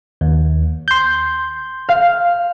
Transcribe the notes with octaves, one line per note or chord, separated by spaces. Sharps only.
D#2
C6 G6
F5